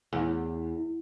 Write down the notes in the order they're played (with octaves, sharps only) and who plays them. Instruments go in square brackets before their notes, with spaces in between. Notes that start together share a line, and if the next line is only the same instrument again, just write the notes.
[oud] E2